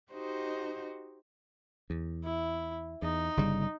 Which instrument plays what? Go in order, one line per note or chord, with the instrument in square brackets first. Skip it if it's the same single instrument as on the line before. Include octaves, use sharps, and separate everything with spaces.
[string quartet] D#4 F#4 G4 C5 D#5
[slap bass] E2
[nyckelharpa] E4
[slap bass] E2 [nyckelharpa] D#4
[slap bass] G1 C#3 G3